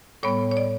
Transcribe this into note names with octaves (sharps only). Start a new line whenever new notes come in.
A2 G3 B3 C#5
C#5
D5